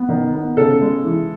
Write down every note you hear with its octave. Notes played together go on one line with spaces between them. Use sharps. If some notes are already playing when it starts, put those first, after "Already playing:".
Already playing: B3
D#3
B3
C#3 A4
G#3
E3